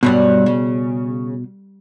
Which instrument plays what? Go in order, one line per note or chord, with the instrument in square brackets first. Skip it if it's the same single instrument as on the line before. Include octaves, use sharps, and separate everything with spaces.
[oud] G2 F#3 G3 [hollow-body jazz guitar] B2
[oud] C#3